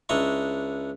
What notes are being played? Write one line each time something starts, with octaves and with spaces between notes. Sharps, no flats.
C#2 D4 E4 D#5 A#5 C#6